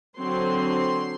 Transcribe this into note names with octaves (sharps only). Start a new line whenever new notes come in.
D3 F#3 C4 C6